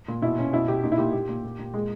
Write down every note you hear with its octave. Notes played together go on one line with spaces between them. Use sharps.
A#2
B2 E4
B2 C#4
B2 E4
B2 G4
A#2 D#4
E4
A#2 G4
A#2 G4
A#2
A#2
A#2
A#2 G#3